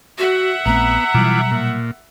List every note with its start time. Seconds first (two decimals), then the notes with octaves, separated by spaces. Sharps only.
0.18 F#4 E5 F#5
0.66 A#1 A3 B3 C4 A#5
1.14 B2 E3 F#3 G3 F4 D6
1.51 A#2